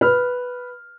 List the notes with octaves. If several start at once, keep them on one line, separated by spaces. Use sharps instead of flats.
B4 F6